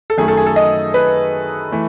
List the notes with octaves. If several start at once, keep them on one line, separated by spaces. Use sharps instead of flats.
A4
F#2 D#3 A3 G#4
A4
G#4
A4
D#5
B4
E3 A3